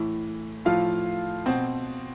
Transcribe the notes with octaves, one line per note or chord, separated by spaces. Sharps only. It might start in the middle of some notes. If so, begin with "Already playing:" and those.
Already playing: A2 E3
A2 F3 F4 F5
B2 C4 C5